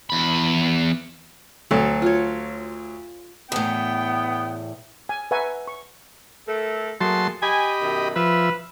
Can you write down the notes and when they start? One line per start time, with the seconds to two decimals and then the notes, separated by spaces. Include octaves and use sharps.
0.10 E2 B5
1.71 D2 F#3 A4
2.02 F4 C#5
3.52 E2 A2 B3 G5
5.09 G#5
5.31 B4 E5 F#5 G#5 A#5 C#6
5.67 C#6
6.48 A3 A4 A#4
7.01 F#3 A3 A#3 G#4 A5 C6
7.43 G4 D#5 G#5 B5
7.81 F#2 B2 D#3
8.16 F3 B4 E5